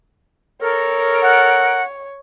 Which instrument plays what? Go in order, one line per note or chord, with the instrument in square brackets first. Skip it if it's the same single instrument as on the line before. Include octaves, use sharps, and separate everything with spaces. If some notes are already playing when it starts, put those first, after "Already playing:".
[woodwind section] A4 A#4 [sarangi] C#5
[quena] F#5